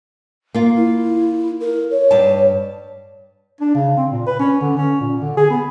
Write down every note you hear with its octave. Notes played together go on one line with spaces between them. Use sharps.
A#3 F4
E4
A#4
C#5
G2 A5
D4
C#3
C4
A#2
B4
C#4
D3
C#4
A#2
D3
G#4
B3